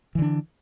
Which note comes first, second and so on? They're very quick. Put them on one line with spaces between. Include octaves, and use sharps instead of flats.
E3 D3 D4